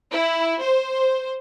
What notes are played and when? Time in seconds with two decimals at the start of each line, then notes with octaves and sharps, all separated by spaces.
0.11 E4
0.61 C5